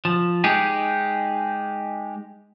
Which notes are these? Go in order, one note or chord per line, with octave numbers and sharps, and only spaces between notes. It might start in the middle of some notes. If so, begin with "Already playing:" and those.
F3
G#3 D#4 G4 G#4